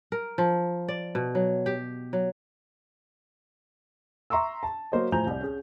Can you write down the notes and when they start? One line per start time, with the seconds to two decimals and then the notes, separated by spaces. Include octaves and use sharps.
0.12 A#4
0.38 F3
0.89 D5
1.15 B2
1.35 F#3
1.66 G4
2.13 F#3
4.30 E5 A#5 C6 C#6 E6
4.63 A5
4.92 F#3 A#3 C5 C#5 D#5
5.12 A2 F3 G#5 A#5 G6 F7
5.26 C2 D5
5.40 C#4 G#4